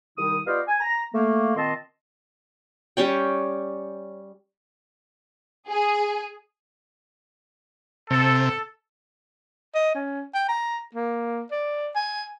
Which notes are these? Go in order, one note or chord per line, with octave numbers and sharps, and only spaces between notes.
C2 D#3 G3 D#4 D#6
B3 F4 G4 D5 D#5 F5
G#5
A#5
A3 A#3
A#2 D#3 C4 D#5 A5 C6
G3 C#4 C#5 G5
G#4
C3 A4
D#5
C#4
G5
A#5
A#3
D5
G#5